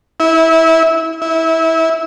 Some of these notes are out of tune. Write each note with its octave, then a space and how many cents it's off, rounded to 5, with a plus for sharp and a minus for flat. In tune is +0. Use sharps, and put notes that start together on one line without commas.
E4 -20
E4 -20